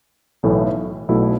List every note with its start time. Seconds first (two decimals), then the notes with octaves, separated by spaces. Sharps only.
0.43 B1 A2 E3 A3
1.09 B1 B2 A3 E4